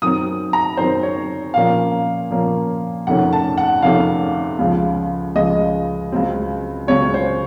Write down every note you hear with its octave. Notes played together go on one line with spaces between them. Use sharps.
F#2 D#3 F#3 C4 D#6
A#5
F#2 D#3 F#3 C4 C5
C#5
A#2 F3 A#3 C#4 F5
A#2 F3 A#3 C#4
F2 C3 D#3 A3 C#4 F#5
A5
F#5
F2 C3 D#3 A3 C#4 F5
C#2 C#3 F3
C#2 C#3 F3 D#5
C#2 C#3 F#3 C4
C#2 C#3 F#3 C4 C#5
C5